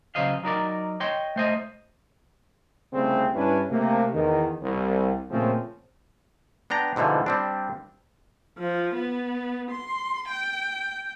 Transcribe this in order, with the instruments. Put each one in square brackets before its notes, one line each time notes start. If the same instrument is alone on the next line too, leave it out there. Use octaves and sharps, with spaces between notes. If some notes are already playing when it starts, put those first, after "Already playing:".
[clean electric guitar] C#3 F#3 C5 D#5 F5
F#3 D#4 A#4 D5
C#5 D#5 G5 C6
A3 C5 D#5
[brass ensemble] C2 C#3 G3 A3 C4
G2 C#4 D4 E4 B4 G#5
C3 A3 A#3
E2 D#3
C2
A#2 C#3 F3 A3 C4 C#4
[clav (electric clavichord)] B3 D4 G5 A#5
G#2 B2 D3 E3 F3
G3 C4 D4
[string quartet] F3
B3
C6
G5